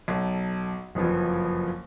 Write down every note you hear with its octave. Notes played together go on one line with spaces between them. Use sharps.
B1 A4
F#1 F2 E3 F3